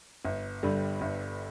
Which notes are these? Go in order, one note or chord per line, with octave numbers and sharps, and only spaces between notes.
G1
G2 D3 G3
G1